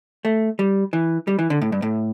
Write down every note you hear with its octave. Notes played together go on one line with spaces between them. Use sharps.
A3
G3
E3
G3
E3
D3
A2
G2
A2